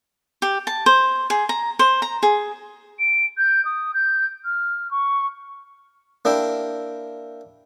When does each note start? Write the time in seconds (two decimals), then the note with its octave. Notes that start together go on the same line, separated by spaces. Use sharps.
0.42 G4
0.67 A5
0.86 C5
1.30 G#4
1.49 A#5
1.79 C5
2.02 A#5
2.23 G#4
2.99 D7
3.38 G6
3.65 D#6
3.94 G6
4.45 F6
4.91 C#6
6.25 A#3 D4 E4 G4